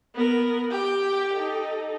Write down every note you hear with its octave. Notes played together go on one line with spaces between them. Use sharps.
B3 A#4
G4 G5
D#4 A4